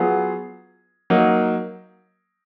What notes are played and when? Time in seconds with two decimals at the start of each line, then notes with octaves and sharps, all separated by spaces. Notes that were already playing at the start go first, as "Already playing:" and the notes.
Already playing: F#3 B3 F4 G#4
1.10 F#3 A#3 D#4